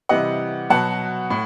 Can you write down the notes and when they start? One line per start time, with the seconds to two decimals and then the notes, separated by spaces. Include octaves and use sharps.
0.09 C3 E3 G3 D#5 F#5
0.70 B2 F#3 F#5 A5
1.30 A2